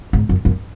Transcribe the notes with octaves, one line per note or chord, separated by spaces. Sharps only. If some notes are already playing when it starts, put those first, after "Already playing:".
G#2
F#2
F#2